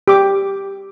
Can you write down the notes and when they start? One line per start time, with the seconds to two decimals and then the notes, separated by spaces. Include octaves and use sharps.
0.08 G4 D6